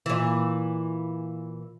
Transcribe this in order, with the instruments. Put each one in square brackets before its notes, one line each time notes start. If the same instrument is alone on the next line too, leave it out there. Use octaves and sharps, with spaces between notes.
[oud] A#2 E3